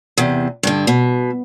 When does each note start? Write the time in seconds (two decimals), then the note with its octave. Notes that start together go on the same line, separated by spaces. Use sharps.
0.17 E2 C3
0.63 G2 D3
0.87 B2